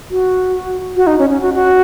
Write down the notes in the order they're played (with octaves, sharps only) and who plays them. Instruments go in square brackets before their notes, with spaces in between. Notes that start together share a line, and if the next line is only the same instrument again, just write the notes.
[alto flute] F#4
F#4
D#4
C#4
C#4
F#4
F#4